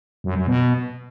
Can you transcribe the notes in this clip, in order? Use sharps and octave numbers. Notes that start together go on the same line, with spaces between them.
F#2
F#2
B2